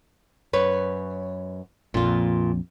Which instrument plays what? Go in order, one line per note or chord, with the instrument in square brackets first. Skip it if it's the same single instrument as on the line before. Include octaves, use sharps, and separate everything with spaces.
[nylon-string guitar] F#2 B4 C#5
[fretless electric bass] A#1 F2 [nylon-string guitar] A#2 F4